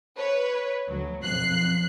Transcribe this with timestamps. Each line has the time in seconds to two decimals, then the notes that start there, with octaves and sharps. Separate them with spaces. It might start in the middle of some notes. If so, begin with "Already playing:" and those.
0.17 B4 C#5
0.89 D2 F#3
1.24 B1 F2 F#6 C7